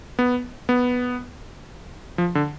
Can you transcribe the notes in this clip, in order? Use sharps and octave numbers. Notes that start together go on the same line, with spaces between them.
B3
B3
F3
D3